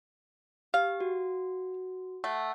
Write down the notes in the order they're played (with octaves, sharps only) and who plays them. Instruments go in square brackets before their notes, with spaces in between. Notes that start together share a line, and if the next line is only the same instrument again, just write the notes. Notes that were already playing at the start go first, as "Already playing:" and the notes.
[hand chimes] G4 [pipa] F5
[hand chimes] F#4
[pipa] A3 [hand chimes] F#5